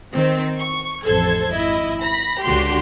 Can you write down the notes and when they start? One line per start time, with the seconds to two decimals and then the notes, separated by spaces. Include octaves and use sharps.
0.13 D#3 C4
0.57 C#6
1.04 A1 F2 A4 C5 G#6
1.53 G#1 E4 D#5
2.02 B5 A#6
2.43 C#2 D3 F#4 G4 C6